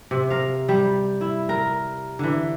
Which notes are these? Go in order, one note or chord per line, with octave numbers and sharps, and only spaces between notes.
C3
A#4 F5
G3
E4
A#4
D3 E3